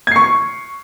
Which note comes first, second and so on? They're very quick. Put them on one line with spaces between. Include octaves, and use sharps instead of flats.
G#6 C7 C#6